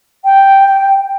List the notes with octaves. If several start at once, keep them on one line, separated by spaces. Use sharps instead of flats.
G5